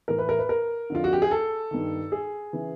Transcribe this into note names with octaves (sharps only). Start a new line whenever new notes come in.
A2 E3 A#4
B4
A#4
B4
A#4
F2 D3 F4
F#4
G4
G#4
A4
G2 D#3
G#4
C#3 E3